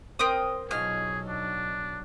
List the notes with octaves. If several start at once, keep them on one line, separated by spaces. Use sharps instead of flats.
C4 A#4 C5 D#6
B1 B2 F#3 D#4 F4 G#4 F6
D4